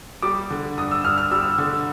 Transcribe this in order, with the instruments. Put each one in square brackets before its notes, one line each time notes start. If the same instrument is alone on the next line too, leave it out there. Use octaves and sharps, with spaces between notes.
[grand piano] G3 D6
D3
G2 D#6
E6
G2 F6
F6
G3 E6
D3